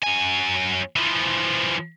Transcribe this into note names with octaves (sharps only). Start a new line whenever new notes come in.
F#2 G#5
E3 F3